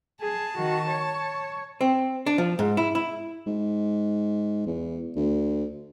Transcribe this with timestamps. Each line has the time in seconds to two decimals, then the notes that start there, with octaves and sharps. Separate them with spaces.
0.21 G#4 A5
0.57 D#3 F#4
0.90 C#5
1.81 C4
2.26 D4
2.38 F3
2.59 G#2
2.77 E4
2.95 E4
3.46 G#2
4.66 E2
5.16 D2